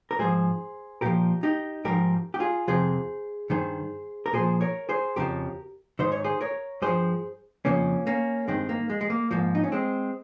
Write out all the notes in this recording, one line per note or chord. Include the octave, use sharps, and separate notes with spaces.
A#4
G#2 F3 G#4 C5
A#2 F3 G4 A#4
D#4 G4
G#2 F3 G4 A#4
G4
F4 G#4
F2 C3 F3 G#4 C5
G2 D#3 G#4 C5
A#4
A#2 F3 G#4 C5
A#4 C#5
G#4 C5
F2 C#3 F3 G4 A#4
G#2 D#3 C5
C#5
G#4 C5
A#4 C#5
G2 F3 G#4 C5
F2 C#3 F3 A#3 C#4
A#3 C#4
G2 D#3 G#3 C4
A#3
G#3
G#3
A#3
G#2 F3 A#3
D#4
C#4
G#3 C4